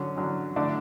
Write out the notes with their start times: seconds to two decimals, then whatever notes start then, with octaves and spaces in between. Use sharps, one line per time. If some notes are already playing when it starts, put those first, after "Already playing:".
Already playing: D3 F#3 C#4
0.17 D3 F#3 C#4
0.56 D3 A3 D4